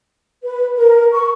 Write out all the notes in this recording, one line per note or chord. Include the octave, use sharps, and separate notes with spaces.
B4
A#4
C#6